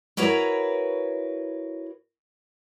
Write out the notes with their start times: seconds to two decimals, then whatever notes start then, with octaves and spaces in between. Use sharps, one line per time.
0.17 E4 F#4 A#4 B4 C#5 A#5